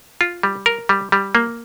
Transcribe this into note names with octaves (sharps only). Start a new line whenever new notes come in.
F4
G3
A#4
G3
G3
A#3